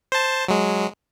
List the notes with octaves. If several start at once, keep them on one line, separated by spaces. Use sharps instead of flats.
C5 A5
F#3 G#3